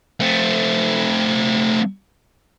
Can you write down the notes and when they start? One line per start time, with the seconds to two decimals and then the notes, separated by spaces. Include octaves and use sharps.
0.20 A3 C4